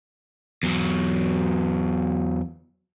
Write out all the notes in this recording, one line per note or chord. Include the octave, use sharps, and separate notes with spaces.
E2 F#3